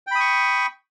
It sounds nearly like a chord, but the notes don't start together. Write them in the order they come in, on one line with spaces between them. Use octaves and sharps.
G5 B5 D#6 C#6